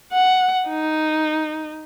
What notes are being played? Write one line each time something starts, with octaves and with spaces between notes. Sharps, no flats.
F#5
D#4